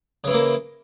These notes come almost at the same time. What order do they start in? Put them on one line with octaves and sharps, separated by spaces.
C#3 E3 E4 A#3